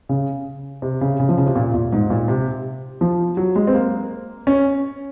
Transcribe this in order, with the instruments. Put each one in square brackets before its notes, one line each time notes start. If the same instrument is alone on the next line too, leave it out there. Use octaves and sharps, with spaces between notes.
[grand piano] C#3
C3
C#3
C#3
F3
C#3
C3
A#2
A#2
G#2
A#2
C3
F3
F#3
G#3
C4
A#3
C#4